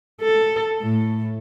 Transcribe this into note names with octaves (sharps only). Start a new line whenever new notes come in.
A4
A2